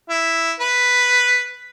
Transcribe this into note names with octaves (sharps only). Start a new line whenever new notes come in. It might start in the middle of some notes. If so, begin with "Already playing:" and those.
E4
B4